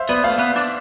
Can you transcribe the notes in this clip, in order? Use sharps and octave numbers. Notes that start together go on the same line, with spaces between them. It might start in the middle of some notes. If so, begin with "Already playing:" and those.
Already playing: C5 E5 F5
B3 B4 D5
A3 D5 F5
B3
D4